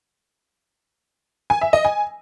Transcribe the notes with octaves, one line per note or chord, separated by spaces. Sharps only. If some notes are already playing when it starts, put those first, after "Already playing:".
G#5
E5
D#5
G#5